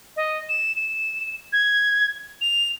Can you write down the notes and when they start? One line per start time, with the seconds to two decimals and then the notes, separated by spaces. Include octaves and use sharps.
0.16 D#5
0.49 E7
0.76 E7
1.53 G#6
2.41 F7